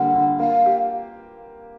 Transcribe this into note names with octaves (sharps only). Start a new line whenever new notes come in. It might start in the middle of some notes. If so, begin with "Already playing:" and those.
Already playing: D3 G3 A#3 F#5
D3
A#3 F5
G4